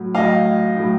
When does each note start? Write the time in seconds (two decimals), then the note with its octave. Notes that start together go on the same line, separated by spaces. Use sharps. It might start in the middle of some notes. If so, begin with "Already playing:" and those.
Already playing: A2 F#3
0.15 A2 F#3 D#5 F5
0.76 A2 F#3